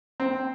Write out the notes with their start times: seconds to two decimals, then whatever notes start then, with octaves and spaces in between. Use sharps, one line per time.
0.20 C4